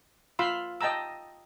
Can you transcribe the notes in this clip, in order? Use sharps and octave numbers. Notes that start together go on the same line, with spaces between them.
F4 F5 B5 C6 E6
D#5 G5 A5 A#5 E6